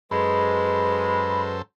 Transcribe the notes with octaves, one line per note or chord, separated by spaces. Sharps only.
F#2 G#3 A4 B4 C5 B5